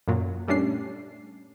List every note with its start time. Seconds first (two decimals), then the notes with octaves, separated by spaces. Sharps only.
0.08 F#2 A#2 F#3
0.48 A#2 G3 A3 C#4 D4 C7